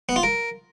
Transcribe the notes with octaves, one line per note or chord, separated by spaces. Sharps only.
B3
F4
A#4